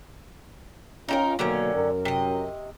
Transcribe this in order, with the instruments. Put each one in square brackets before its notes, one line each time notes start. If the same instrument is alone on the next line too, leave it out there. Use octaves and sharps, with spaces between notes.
[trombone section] C#4 F4 [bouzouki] D#4 G4 A#4
[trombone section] B2 F#3 A#3 [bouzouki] D3 D#3 C#4
[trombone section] F#2 A#4
[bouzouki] C3 D#5